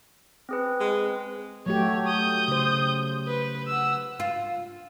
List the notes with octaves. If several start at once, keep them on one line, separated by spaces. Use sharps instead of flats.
C4 G#4 B4
G#3
F#3 A3 G4 C#5
D#6 G6
C#3 C5
B4
F#5 E6
F4